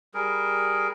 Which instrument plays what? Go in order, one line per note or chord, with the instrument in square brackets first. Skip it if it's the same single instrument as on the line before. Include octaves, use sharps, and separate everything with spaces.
[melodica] G3 G#4 A#4